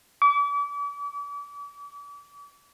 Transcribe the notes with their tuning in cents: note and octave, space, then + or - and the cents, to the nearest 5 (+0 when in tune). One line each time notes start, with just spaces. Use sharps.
D6 -40